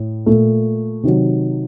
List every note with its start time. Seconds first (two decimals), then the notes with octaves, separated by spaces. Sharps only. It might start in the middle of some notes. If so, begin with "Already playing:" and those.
Already playing: A2
0.26 A#2 A3
1.03 C3 D#3 F#3